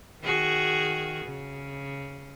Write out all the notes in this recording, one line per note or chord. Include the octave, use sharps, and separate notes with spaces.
D#3 F#4 G#4
C#3